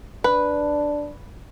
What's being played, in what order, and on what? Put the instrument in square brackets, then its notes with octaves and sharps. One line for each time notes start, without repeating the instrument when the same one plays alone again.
[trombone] D4 [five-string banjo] B4